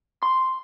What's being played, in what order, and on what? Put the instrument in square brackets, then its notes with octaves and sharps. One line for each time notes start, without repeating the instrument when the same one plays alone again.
[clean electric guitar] C6